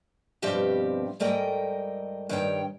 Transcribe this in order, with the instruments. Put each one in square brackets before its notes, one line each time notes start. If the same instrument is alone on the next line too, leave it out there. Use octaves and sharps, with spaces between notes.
[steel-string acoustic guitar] G2 B2 F3 C4 G4 E5
G#2 G3 A3 A#4 D#5 G5
G2 D#3 G3 C#5 G5